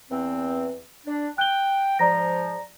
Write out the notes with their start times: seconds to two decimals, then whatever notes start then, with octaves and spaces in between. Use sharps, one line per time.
0.11 E2 C4
1.06 D4
1.38 G5 F#6 G7
1.99 G#2 F3 D5 A#5 A#6